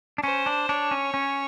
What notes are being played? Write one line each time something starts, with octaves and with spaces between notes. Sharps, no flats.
D4
C#4 C5
D4
D4 C#5
C#4
C#4